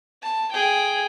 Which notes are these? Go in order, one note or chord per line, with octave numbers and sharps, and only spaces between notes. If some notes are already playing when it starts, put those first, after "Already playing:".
A5
G#4 G5